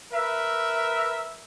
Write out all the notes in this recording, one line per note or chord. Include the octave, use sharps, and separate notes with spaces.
A#4 B4 E5